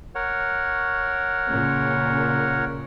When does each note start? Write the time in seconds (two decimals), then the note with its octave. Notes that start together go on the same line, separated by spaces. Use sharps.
0.15 A#4 C#5 F#5
1.49 A#2 C#3